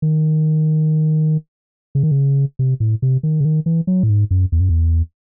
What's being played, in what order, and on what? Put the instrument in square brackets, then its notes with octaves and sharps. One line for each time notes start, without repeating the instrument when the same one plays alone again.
[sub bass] D#3
C#3
D#3
C#3
C3
A2
C3
D#3
C#3
D#3
E3
F#3
A2
G#2
F#2
E2
F#2
E2